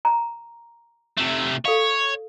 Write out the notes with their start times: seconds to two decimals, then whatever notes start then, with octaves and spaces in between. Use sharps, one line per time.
0.05 A#5
1.18 C3 A3
1.65 A4 C#5 F5